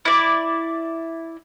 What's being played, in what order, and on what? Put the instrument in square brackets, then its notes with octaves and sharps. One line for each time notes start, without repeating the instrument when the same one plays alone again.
[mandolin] E4 D5